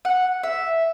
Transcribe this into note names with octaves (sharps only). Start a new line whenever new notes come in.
F#5
E5